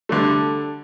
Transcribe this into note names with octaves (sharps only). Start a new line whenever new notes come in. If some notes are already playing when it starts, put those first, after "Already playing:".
D3 G3 A3